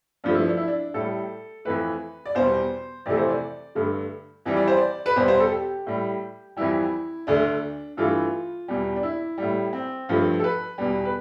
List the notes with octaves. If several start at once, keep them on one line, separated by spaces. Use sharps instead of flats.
G2 F3 A3 D4
E4
D4
E4
D4
A2 G3 A4
F2 E3 A3 B4
D5
E2 B2 G3 C5
F2 C3 E3 A3 D5
C5
D5
G2 D3 A3
F2 E3 G3
D5
C5
D5
B4
E2 B2 G3 C5
C5
A4
G4
A2 G3
F2 E3 G3 E4
D2 D3 A3 D4
G2 E3 A3 F4
E2 B2 G3
D4
E4
A2 G3
C4
G2 F3 A3
A4
B4
E2 B2 G3
B4